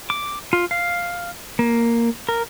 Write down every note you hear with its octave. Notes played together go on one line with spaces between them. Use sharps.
D6
F4
F5
A#3
A#4